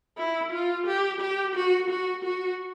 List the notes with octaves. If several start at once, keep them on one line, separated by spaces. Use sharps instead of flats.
E4
F4
G4
G4
F#4
F#4
F#4